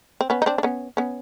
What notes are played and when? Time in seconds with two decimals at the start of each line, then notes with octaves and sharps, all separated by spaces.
0.21 C4
0.30 B3 C#4
0.42 D#4
0.46 C4 D4
0.58 D4
0.63 B3 C#4
0.97 B3 C#4